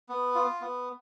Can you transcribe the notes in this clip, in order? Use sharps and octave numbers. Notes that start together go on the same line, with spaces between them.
B3
F4
B3